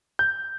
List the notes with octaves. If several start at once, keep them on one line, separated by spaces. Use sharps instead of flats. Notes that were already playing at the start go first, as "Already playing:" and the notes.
G6